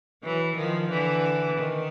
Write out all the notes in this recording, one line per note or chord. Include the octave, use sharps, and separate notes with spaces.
E3 F#3
D#3 F3
D3 E3
D#3